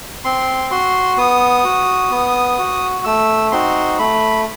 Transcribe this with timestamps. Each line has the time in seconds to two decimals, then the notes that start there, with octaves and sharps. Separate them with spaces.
0.25 C4 C6
0.71 F#4 C6
1.18 B3 D#6
1.64 F#4
2.11 B3
2.58 F#4
3.05 A3 E6
3.52 C4 D#4 F#4 C6
3.99 A3 B5